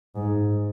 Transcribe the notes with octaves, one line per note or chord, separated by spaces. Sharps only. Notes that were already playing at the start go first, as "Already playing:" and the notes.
G#2